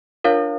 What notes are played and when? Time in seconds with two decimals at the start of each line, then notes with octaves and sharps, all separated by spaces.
0.24 D4 F4 A#4 C#5 F5